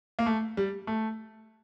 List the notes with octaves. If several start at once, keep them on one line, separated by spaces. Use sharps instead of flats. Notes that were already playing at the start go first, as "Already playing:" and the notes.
A#3
A3
G3
A3